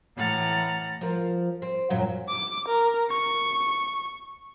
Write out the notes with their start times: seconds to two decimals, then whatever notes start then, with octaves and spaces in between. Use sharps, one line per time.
0.15 A2 E3 F#5 A#5 F6 A6
1.01 F3 A#4
1.62 C4
1.90 F#2 A#2 F#3
2.29 D6
2.68 A#4
3.10 C#6